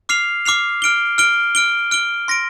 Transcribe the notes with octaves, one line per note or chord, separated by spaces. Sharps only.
D6 F6 C7 F7
D6 F6 C7 F7
F6 D7 G7
F6 D7 G7
F6 D7 G7
F6 D7 G7
C6 A#6 D7